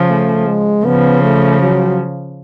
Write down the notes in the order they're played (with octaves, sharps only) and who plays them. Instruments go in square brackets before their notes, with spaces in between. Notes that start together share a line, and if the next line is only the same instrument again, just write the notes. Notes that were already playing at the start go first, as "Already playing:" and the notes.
Already playing: [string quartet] C#3 F3
[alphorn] A3
G#3
[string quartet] C#3 F3 [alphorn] B3
[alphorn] A3
F#3